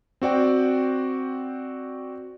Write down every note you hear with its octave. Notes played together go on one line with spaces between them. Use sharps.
C4 F#4 D5 G5